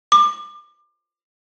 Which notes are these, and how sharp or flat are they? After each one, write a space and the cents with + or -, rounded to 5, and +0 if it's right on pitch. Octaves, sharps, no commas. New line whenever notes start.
D6 +30